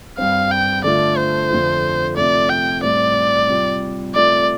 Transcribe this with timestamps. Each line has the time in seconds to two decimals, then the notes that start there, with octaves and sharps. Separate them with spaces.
0.18 G2 G3 C4 F5
0.51 G5
0.84 D3 A3 F4 D5
1.17 C5
1.50 F2 D3 A3 F4
2.17 C3 F3 A3 D5
2.49 G5
2.83 A2 G3 C4 D5
3.49 C3 G3 F4
4.15 C3 A3 F4 D5